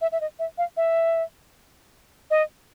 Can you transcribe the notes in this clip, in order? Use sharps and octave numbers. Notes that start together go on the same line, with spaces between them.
E5
E5
D#5
E5
F5
E5
D#5